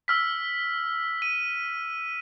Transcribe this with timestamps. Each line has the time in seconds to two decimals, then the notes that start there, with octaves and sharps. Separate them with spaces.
0.08 E6 F6 B6
1.22 D#7